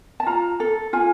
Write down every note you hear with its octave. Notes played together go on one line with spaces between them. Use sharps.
A5
F4 A#5
A4
F4 G#5